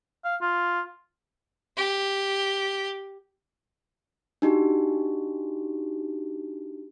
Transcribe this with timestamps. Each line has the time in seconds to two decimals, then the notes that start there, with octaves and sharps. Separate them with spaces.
0.24 F5
0.41 F4
1.77 G4
4.42 D4 D#4 F#4 G4